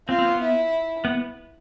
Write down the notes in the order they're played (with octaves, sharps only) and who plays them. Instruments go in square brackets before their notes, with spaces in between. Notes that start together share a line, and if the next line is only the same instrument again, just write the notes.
[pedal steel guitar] C4 [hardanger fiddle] F4
[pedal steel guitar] C4
B3
[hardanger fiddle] E4
[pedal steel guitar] B3